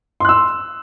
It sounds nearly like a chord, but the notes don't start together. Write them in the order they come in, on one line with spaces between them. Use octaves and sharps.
C6 F#6 E6